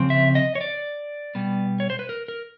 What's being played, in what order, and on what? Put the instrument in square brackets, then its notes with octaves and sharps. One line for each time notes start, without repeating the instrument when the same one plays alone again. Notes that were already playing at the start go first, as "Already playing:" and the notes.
Already playing: [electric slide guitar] C#3 F3 C4
E5
D#5
C#5
D5
B2 G3 B3
C#5
C5
B4
A#4
A#4